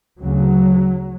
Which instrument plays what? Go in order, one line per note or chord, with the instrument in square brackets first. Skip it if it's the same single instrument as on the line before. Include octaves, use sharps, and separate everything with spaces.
[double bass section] D2 C#3 F#3